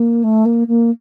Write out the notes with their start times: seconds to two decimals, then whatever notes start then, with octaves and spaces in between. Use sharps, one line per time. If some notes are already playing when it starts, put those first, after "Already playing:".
Already playing: A#3
0.23 A3
0.45 A#3
0.67 A#3